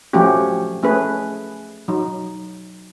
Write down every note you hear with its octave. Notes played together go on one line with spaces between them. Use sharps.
F3 F#3 A3 C#4 F#4 G4
A3 C#4 G#4 B4
F#3 D#4